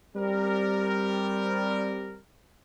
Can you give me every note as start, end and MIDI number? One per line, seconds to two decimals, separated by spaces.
0.16 2.19 55
0.16 2.19 60
0.16 2.19 70